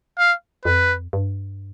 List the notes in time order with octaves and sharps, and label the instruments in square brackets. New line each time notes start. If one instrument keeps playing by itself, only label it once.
[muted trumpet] F5
[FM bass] F2 [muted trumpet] B4
[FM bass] G2